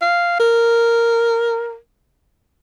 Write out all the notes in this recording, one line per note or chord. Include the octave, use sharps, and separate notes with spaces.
F5
A#4